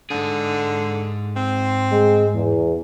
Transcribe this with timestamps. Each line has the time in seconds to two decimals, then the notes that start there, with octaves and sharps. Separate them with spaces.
0.10 G#2 D3 G#4
1.36 C4
1.92 G#3
2.34 E2